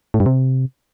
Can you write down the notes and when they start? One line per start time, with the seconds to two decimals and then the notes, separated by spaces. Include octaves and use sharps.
0.14 A2
0.20 G2
0.26 C3